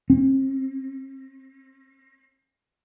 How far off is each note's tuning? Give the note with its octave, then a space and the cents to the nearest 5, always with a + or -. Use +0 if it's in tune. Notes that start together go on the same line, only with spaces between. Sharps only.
C4 +40